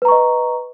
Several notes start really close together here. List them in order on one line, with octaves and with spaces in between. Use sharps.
B4 A#5 C#6 D#5